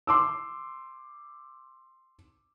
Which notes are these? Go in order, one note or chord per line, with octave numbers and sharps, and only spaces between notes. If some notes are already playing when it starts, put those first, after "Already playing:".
C6 D6 E6